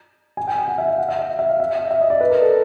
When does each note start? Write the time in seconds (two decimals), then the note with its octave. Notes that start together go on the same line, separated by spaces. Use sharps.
0.37 G#5
0.47 G5
0.58 G5
0.68 F#5
0.78 E5
0.88 F5
0.98 F#5
1.09 E5
1.19 E5
1.39 E5
1.49 F5
1.60 E5
1.75 E5
1.91 E5
2.01 D#5
2.10 D5
2.21 B4
2.30 A#4
2.41 A4